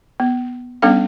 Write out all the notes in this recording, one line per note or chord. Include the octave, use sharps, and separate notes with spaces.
B3
G3 B3 C#4 D4 A4 F5